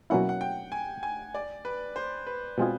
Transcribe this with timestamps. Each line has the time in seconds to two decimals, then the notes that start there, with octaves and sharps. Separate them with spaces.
0.10 B2 F#3 A#3 C#4 E4 F#5
0.29 F#5
0.41 G5
0.72 G#5
1.03 G#5
1.35 D5
1.65 B4
1.96 C5
2.27 B4
2.58 B2 G#3 C4 F4 G#4